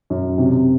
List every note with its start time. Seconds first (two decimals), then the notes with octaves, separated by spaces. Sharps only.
0.10 F#2
0.38 C3